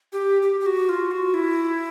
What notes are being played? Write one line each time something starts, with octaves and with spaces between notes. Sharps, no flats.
G4
G4
G4
F#4
F4
F#4
E4